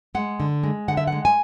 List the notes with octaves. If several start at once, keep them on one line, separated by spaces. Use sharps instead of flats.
G#3 F#5
D3
G#3
D3 F#5
E5
G#3 F#5
G#5